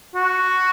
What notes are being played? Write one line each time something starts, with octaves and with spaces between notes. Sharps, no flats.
F#4